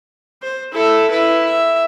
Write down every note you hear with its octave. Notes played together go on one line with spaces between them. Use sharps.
C5
E4 A4
E4 B4
E5